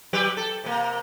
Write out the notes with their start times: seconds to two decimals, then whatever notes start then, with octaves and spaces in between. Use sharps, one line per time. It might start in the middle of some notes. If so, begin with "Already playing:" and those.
0.13 F#3 G4 B4
0.37 A4
0.64 C3 A#3